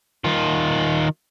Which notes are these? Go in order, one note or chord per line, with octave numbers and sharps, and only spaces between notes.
D#3 F4